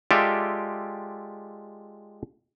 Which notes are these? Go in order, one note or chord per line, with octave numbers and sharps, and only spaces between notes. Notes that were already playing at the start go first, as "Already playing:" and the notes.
G#3 F4 G4 A4 D5 E5